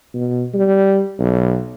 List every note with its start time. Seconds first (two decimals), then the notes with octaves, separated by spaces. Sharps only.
0.14 B2
0.54 G3
1.19 B1